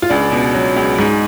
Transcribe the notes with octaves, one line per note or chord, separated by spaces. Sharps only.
F4
C#2 D4
B2
F#3
C#2
G#2